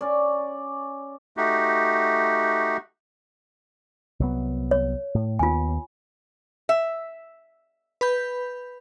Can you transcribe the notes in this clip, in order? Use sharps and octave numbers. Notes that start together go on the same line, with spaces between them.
C#4 D5
A3 D#4 F#4 G4
C2 F#3 B3
C#5
A2
D#2 B3 F4 G#5
E5
B4 B5 G6